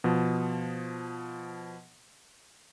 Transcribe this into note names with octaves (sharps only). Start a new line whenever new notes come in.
B2 F3